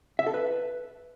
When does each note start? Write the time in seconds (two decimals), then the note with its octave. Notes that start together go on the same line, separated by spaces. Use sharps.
0.19 E5
0.26 A4
0.34 B4